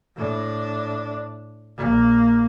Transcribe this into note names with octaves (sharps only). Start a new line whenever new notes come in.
A2 D4
A#1 A#3